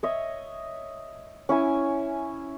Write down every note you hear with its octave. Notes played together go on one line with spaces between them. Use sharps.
C#5 D#5 E5
C#4 E4 G#5